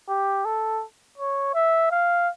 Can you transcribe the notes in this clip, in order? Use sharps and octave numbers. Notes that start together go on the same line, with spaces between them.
G4
A4
C#5
E5
F5